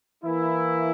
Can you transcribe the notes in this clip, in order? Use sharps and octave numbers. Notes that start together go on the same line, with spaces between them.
E3 A#3 E4